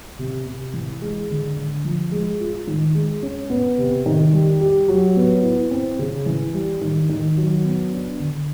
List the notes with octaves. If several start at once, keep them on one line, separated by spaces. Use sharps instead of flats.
C3
C3
E3
G#3
D3
D3
F3
G#3
F4
D#3
G#3
C#4
B3
C3
D#3
G3
G4
F#3
B3
E4
C4
C#3
E3
G3
D#3
D#3
F#3
B3
D4
D3